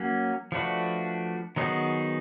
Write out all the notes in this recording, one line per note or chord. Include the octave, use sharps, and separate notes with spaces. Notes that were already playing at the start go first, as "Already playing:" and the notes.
Already playing: F#3 A#3 C#4
F3 A3 D4 F#4 B4
D#3 F#3 B3 D#4 G#4